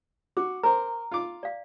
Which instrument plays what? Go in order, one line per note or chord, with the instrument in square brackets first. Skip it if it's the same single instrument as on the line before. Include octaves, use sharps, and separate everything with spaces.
[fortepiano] F#4 [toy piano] D6
[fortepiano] A#4 C5 [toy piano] A#5
[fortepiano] F4 D6
[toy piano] D5 F5